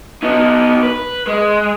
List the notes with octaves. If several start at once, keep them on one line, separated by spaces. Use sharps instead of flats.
B3 D#4
B4
G#3